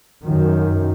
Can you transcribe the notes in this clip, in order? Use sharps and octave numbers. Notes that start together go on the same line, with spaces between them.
F#2 D#3